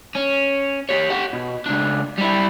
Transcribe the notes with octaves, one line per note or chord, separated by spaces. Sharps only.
C#4
G4 C#5
G4 F#5
B2
C#2 D4
G3 E4